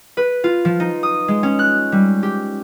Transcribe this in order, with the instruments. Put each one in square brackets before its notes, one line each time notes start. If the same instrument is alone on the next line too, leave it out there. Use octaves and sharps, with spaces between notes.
[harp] B4
F4
F3
D#4
D#6
G#3
C#4
F#6
G3
G4